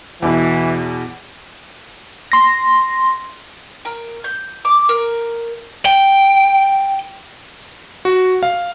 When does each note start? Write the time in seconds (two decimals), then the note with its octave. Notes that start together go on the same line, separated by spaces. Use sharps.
0.22 E2 B2 E3
2.32 C6 A#6
3.85 A#4
4.24 G6
4.65 D6
4.89 A#4
5.86 G5
8.05 F#4
8.43 F5